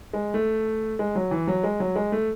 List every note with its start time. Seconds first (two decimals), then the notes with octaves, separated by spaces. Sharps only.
0.13 G#3
0.34 A3
0.99 G#3
1.15 F#3
1.31 E3
1.47 F#3
1.64 G#3
1.80 F#3
1.96 G#3
2.12 A3